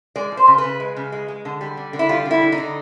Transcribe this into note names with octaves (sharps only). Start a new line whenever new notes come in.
G#3 D5
F3
C5
C#3
B4
C#3
G#3
C#3
G#3
G#3
D3
G3
D3
D3
E4
G3 F4
D3
E4
D3
D#4
D3